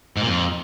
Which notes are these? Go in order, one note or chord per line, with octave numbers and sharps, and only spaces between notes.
G#2
A#2
F2